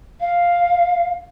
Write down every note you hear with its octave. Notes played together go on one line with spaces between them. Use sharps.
F5